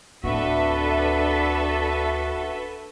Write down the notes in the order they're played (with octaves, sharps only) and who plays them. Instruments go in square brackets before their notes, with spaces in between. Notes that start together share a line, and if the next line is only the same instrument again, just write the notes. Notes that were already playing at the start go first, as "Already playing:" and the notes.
[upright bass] D1 [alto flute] D4 [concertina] F#4 [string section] A4 B4 E5